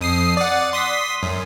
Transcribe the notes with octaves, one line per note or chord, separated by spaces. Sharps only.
F2 D#6 C7
D5 F#5
C6 D#6 B6
F#2